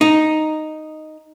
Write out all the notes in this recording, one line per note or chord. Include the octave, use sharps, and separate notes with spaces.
D#4